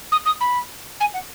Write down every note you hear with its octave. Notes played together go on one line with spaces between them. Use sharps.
D#6
D#6
B5
G#5
F#5